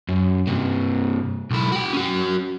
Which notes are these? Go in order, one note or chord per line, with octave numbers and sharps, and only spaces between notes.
F#2
G2 C3
B1 E4
F#4 G5
C#4 F#4